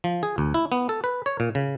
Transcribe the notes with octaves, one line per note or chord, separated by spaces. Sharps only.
F3
G#4
D2
E4
B3
A4
B4
C#5
A#2
C#3